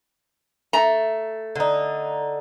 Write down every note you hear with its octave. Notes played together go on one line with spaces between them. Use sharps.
A3 A#5
D3 D#4